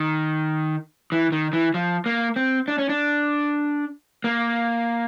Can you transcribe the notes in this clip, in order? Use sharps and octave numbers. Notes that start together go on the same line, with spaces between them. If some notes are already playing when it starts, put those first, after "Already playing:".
Already playing: D#3
E3
D#3
E3
F3
A#3
C4
D4
C#4
D4
A#3